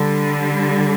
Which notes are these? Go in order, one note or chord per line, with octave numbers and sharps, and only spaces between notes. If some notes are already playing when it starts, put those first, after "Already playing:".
Already playing: D3 G3